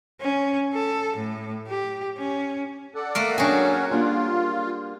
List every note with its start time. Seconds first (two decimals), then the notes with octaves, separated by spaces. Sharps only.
0.21 C#4
0.74 A4
1.16 A2
1.68 G4
2.18 C#4
2.95 A4 D5 F#5
3.15 A3 A#3 A#4
3.38 F#3 C#4 D4 F#4 G#4 C#5 G5
3.91 G3 A#3 D4 F4